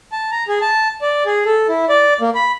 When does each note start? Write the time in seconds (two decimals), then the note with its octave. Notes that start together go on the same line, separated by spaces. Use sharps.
0.12 A5
0.31 A#5
0.48 G#4
0.61 A5
1.02 D5
1.26 G#4
1.46 A4
1.69 E4
1.89 D5
2.21 A#3
2.35 B5